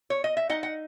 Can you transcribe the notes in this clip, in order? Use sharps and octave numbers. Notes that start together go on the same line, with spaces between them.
C#5
D#5
E5
D#4 D#5 F#5
F#5